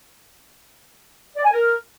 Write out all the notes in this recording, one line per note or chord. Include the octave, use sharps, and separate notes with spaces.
D5
G#5
A#4